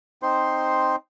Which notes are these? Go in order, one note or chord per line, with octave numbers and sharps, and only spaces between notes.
C4 D#4 C5 C6